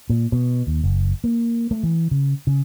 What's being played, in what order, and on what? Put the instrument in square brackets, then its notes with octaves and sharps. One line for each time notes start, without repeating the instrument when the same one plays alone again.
[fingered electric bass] A#2
B2
D#2
F#1
A#3
A3
E3
C#3
C#3